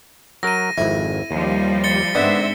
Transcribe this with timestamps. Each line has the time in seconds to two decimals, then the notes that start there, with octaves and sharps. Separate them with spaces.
0.43 F#3 A#4 A#6 D#7
0.78 G#1 F2 E4
1.31 D#2 F3 G3
1.84 A6 C#7 G7
2.15 G#2 D3 B3 C4 E5